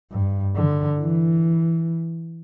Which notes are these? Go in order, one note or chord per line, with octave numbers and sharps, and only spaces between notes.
G2
D3
E3